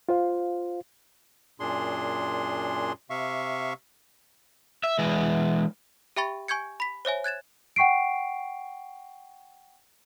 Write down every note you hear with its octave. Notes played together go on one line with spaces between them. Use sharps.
F4 C5 F5
F#2 A#2 D4 G#4 C6
C3 E5 F5 C#6
E5
E3 G#3
G4 E5 G5 B5 C#6 A6
G#5 C#6 G6 G#6 C#7
B5 B6
C5 C#5 E5 G#5
F#6 G#6 A6 E7
F#5 G5 C#6 C7 D7